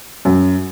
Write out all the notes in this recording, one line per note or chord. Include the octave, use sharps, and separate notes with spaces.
F#2